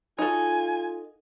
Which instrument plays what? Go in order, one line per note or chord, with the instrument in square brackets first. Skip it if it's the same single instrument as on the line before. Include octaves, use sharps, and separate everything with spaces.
[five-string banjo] D#4 F#4 A4 [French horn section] F4 [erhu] G#5